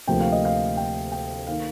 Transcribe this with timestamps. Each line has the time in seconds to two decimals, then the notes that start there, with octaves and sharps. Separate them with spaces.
0.07 D2 C3 F3 A#3 G5
0.20 F5
0.32 D#5
0.45 F5
0.77 G5
1.12 G5
1.47 D#3 A#3 F5